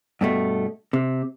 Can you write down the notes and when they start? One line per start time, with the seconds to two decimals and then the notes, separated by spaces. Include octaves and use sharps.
0.21 G2 B2 A3
0.93 C3